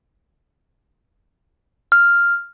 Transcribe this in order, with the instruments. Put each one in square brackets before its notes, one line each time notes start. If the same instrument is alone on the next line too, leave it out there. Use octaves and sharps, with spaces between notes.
[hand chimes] F6